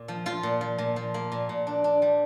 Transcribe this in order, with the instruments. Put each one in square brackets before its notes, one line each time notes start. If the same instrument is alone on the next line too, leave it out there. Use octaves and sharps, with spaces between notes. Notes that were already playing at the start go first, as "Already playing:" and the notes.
Already playing: [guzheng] A#2
F3
F3 F4
A#2
F3
A#2
F3
A#3
A#2
A#2
D4
D4
G3